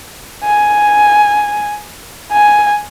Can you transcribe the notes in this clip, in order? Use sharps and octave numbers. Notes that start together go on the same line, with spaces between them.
G#5
G#5